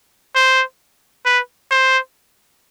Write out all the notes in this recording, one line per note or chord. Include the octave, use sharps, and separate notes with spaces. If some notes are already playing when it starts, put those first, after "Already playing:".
C5
B4
C5